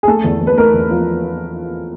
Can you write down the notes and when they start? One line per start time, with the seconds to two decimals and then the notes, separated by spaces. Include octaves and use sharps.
0.03 G#4
0.07 A3 A4
0.24 E2
0.41 E2
0.47 B4
0.58 A3 A#4
0.74 E2
0.91 F3